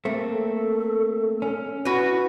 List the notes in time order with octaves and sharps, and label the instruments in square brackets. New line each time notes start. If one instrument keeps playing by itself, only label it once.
[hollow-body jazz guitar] A3 A#3 C4 [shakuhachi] A4
[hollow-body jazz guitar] C#4
[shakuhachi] E4 [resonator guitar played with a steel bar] F#4 B4